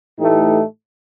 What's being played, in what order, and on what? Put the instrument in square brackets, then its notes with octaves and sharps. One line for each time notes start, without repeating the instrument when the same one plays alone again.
[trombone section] A2 E3 A3 D#4 G4